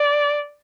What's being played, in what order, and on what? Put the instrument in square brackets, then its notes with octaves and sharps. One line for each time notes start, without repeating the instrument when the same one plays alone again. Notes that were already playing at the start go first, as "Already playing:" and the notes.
Already playing: [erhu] D5